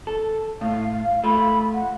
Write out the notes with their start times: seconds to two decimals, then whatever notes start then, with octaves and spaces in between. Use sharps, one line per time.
0.07 A4
0.61 A2 F5
1.24 A3 F4 B5
1.74 F#5